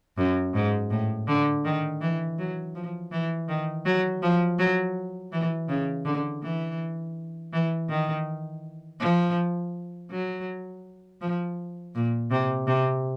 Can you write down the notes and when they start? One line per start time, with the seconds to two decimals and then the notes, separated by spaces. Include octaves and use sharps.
0.17 F#2
0.55 G#2
0.91 A2
1.28 D3
1.65 D#3
2.01 E3
2.39 F#3
2.75 F3
3.12 E3
3.48 D#3
3.86 F#3
4.22 F3
4.59 F#3
5.33 E3
5.69 C#3
6.05 D3
6.43 E3
7.53 E3
7.90 D#3
9.00 F3
10.10 F#3
11.21 F3
11.95 A#2
12.31 C3
12.67 C3